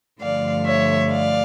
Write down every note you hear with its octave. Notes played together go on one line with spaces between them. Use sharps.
G2 D3 F3 A3 D5 F5
C#5 E5
D5 F5